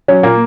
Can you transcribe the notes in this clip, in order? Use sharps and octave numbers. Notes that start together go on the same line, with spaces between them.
F#3 C#4
A#2 A#3